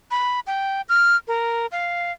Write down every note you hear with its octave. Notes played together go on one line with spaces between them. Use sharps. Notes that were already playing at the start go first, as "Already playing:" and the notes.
B5
G5
F6
A#4
F5